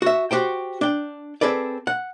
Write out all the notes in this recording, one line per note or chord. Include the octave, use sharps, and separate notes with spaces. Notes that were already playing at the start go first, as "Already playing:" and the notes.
F#4 E5
F#4 G4 C5 G5
D4 G5
C4 G#4 A4 B4 D5
F#5